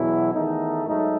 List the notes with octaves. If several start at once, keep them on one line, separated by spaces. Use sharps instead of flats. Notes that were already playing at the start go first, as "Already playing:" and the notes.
Already playing: E2 B2 F#3 B3 E4
E2 D#3 A3 D#4
G#2 F#3 A3 D#4